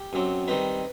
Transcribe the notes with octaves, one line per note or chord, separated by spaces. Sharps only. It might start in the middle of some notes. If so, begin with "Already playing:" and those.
Already playing: G4
F#2 F#3 C4
D#3 G3 C4 D#4 B4